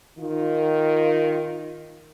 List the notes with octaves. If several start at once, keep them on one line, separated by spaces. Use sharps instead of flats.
D#3 F4